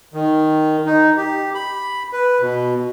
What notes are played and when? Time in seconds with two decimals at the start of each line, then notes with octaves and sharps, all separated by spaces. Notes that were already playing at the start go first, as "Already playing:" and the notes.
0.14 D#3
0.87 D#4
1.17 G4
1.55 B5
2.13 B4
2.41 B2